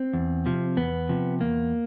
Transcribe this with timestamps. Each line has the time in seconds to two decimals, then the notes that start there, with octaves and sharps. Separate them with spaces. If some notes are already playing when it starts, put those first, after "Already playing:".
Already playing: C4
0.13 E2
0.46 C3 F3
0.77 E2 B3
1.09 C3 F3
1.41 E2 A#3